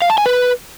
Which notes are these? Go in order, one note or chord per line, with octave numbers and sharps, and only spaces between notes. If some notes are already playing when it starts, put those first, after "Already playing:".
F5
A5
G#5
B4